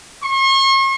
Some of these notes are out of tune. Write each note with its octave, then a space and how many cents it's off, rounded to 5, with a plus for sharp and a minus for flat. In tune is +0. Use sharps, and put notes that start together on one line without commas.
C#6 -45